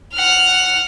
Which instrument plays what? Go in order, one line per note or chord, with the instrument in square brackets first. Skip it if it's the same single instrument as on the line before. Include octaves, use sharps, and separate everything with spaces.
[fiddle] F#5 F6